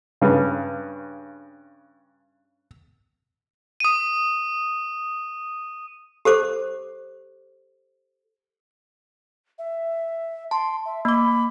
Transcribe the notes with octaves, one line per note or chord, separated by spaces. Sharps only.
G2 C#3
D#6 D#7
G4 A4 C5 D6
E5
A5 C6
E5
A#3 B5 D6